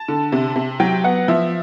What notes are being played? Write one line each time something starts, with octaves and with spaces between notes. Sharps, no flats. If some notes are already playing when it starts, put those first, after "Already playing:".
Already playing: A5
D3
C3
C3
F#3 G5
B3 F#5
F3 E5